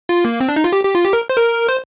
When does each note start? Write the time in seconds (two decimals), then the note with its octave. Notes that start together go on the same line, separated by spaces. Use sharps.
0.09 F4
0.25 A#3
0.41 C4
0.48 D4
0.56 D#4
0.64 F4
0.73 G4
0.84 G4
0.95 F4
1.05 G4
1.13 A#4
1.30 C5
1.38 A#4
1.69 C5